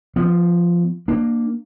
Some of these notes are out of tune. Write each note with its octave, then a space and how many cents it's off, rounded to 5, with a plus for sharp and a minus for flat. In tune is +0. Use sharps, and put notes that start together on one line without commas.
F3 -10 B3 +20
A#3 +0 D4 +25